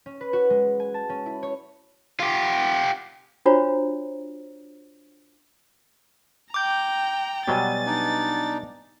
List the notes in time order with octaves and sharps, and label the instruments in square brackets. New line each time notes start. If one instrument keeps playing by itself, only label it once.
[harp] C#4
B4
F#4
G#3
G#5
A5
C#4
E4
C#5
[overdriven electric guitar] F4 G4
[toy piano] D4 F4 F#4 C5 C#5 A#5
[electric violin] G5 A#5 [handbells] D6 G6
[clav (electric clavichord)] B2 F#3 G3 [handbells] B3 D5 G#5 [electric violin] A6
[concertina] D4 D#4